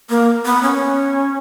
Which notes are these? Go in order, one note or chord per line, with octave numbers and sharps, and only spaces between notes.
A#3
B3
C#4